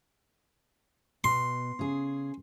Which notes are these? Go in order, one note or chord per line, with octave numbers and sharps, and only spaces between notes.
B2 C6
C#3 G#4